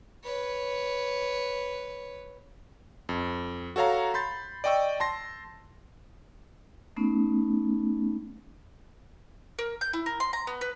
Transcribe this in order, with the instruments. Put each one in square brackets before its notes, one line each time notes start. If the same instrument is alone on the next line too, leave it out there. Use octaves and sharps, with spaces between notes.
[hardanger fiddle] B4 C#5
[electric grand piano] F2
F#4 A4 C#5 F5 A#5
B5 C6 G6 A6
D5 D#5 G5 C#6 E6
A5 C6 A#6
[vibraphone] A3 B3 C#4 D#4
[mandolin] A#4
G6
E4
A#4
C6
A#5
B3
B4